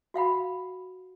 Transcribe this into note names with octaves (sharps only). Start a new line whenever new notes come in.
F#4 F5 F#5 B5